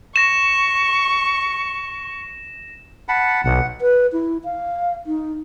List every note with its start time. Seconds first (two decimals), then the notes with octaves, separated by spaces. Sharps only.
0.16 C#6 A#6 E7
3.09 F#5 A5 B5
3.44 B1 F#5
3.81 B4
4.12 E4
4.44 F5
5.06 D#4